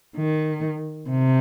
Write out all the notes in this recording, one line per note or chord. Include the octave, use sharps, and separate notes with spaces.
D#3
C3